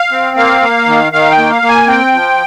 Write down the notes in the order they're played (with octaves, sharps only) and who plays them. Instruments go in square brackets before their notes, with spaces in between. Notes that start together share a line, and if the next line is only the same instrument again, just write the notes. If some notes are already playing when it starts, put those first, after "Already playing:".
Already playing: [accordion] F5
C4
A#3 F5
A#3
D#3
D#3 F5
G5
A#3
F5
A#3
G#5
C4 G5
F3